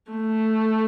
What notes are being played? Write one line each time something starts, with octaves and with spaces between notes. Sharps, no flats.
A3